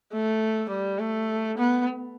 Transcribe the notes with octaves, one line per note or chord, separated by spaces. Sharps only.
A3
G3
A3
B3